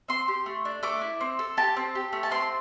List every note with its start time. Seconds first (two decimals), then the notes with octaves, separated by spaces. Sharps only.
0.08 C4 C6
0.28 G4
0.46 A3
0.65 D4
0.83 A3 D6
1.01 E4
1.21 C4
1.39 A4
1.57 G4 A5
1.77 C4
1.95 G4
2.13 A3
2.23 A5
2.31 C4 C6